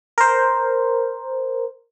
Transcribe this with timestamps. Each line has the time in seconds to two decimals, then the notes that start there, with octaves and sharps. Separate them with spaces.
0.18 A#4 C5